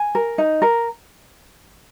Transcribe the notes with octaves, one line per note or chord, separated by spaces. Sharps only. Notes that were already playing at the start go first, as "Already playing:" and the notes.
Already playing: G#5
A#4
D#4
A#4